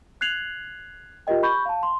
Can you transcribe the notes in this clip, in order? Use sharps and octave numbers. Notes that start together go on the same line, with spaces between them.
F#6 G#6 C7 F7 F#7
F4 G4 A#4 D#5 G5
B5 C#6 G6
F5 A5
C6